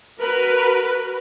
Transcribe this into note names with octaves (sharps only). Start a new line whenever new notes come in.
F#4 A#4 B4